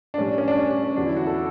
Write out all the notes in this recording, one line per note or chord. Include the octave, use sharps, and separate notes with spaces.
D4
A2 G3 C#4
D4
C#4
D4
C#4
D4
C#4
E2 D3 F#3 D4
E4
F#4
A4